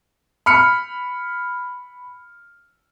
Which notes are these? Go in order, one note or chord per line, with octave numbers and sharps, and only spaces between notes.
B5 F6 C#7